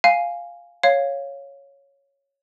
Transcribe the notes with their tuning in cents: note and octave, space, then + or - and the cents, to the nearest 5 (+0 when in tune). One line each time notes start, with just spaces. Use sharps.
F5 +0 G#5 +0
C#5 +0 F5 +0